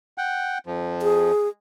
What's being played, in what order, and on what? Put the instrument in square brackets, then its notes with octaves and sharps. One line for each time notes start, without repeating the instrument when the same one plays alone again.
[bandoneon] F#5 G5
F2 F3
[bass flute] G#4